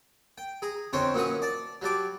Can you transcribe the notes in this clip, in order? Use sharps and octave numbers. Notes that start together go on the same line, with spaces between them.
G5
G#4 A#5
F2 D3 C#4 C5 C#5 G5
A#2 E3 F#3 C#4 F#5 D#6
D5 A5
F#3 G3 A5 D6